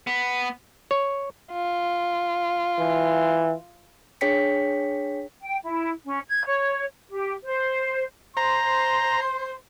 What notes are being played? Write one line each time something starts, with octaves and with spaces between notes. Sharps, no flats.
B3
C#5
F4
E3
D4 G#4 C#5 G5 B6 C#7
G5
E4
C#4
G#6
C#5
G4
C5
C5 A#5 C6